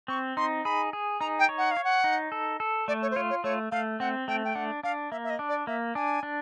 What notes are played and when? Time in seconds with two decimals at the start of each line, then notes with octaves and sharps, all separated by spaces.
0.08 C4 C#6
0.37 D#4 C6
0.65 G#4 B5
0.93 G#4
1.21 D#4 A#5
1.39 G5
1.49 C#5
1.58 F#5
1.71 F5
1.77 C#5
1.84 F#5
2.04 D#4
2.32 A4
2.60 A4
2.88 A3 D5
3.02 C#5
3.11 C5
3.16 F4 C#5
3.30 C#5
3.44 A3 C#5
3.71 A3 F5
4.00 C4 F#5
4.28 A3 G5
4.45 G5
4.55 D4 F#5
4.83 D4 F5
5.11 A#3 E5
5.24 E5
5.30 D#5
5.39 D4
5.49 D5
5.67 A#3 E5
5.95 D4 G#5
6.23 D4